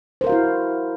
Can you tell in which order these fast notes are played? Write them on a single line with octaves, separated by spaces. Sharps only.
C5 A#4 F5 F#4 E4